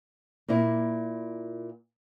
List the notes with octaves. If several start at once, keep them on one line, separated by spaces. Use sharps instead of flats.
A#2 A#3 E4